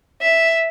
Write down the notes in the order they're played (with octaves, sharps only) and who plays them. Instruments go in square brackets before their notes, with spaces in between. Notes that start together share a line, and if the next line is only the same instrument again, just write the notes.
[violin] E5